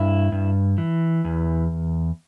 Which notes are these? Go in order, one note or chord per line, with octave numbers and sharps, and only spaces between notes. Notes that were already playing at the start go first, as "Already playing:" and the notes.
Already playing: G2 E4
G2
E3
E2